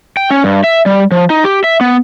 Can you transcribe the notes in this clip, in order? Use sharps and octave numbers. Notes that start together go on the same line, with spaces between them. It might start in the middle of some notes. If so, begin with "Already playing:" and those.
G5
C#4
G2
E5
G3
F3
D#4
G4
E5
B3